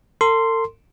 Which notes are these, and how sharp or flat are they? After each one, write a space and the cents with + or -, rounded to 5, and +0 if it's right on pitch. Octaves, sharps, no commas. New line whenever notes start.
A4 +45 C6 -5